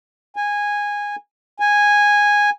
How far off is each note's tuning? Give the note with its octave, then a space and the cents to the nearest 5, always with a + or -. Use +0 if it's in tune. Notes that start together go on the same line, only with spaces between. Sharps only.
G#5 -15
G#5 -10